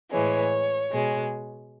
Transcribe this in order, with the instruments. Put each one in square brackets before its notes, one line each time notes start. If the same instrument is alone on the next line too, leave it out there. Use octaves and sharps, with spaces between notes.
[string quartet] A2 E3 G#3 C#5
B2 G#3